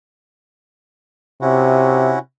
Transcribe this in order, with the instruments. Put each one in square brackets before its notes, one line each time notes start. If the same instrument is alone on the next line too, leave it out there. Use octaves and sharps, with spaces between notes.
[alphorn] C3 [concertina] C#4 E4 F#4